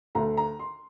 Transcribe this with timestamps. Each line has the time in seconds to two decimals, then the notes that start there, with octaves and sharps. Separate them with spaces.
0.15 D2 D3 A3 A#5
0.37 A#5
0.59 C6